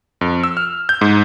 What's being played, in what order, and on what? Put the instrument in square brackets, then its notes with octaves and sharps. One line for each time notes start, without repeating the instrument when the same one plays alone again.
[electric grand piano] F2
E6
F6
G6
G#2